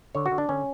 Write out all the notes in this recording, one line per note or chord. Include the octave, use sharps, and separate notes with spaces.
D3 C#5
F#4
D3
D4
D3 C#4